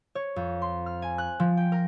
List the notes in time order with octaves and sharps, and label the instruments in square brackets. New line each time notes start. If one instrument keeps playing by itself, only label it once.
[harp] C#5
F2
C6
F6
G#5
F#6
F3
G5
A#4